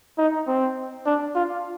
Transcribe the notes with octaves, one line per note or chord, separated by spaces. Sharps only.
D#4
C4
D4
F4